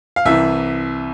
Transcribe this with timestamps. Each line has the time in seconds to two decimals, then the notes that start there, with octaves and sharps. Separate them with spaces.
0.16 F5
0.25 C2 C3 E3 E5